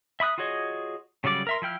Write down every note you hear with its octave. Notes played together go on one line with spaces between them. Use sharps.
E5 B5 D#6 F#6
F4 F#4 G#4 C#5 D#5
C#3 F#3 G3 D5 D6
A#4 E5 C6
F3 E4 G5 F6